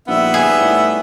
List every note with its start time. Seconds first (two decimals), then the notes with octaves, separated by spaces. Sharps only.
0.08 A#1 G3 B3 D#4 E5
0.34 G#4
0.61 A2